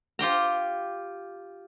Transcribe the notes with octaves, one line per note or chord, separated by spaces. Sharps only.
F4 G4 G5 A#5